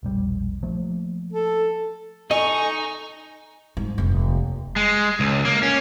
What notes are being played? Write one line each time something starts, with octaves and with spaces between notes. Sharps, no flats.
E1 A#1 G3
F3 A3 A#3
A4
D#4 A4 D#5 G#5 C#6
G#2
F1 D#2
G#3
C#2
A#3
C#4